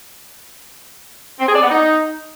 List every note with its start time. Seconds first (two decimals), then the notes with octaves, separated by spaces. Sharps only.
1.39 C4
1.47 G#4
1.54 D5
1.62 B3
1.69 D#4